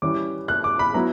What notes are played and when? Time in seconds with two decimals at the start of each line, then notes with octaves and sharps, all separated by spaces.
0.02 E3 G3 C#4 D6
0.48 F#6
0.64 D6
0.79 B5
0.94 F#3 B3 E4 A#5